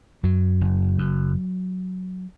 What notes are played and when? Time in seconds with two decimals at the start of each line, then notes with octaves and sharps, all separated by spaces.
0.23 F#2 F#3
0.61 F#1
0.99 F#2